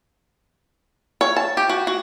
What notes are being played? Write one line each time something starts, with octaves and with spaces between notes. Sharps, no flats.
C#5
A5
G4
F#4
F#4